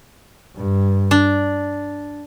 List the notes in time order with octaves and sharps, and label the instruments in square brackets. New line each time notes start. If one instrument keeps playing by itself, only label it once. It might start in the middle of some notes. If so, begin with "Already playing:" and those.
[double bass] G2
[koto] D4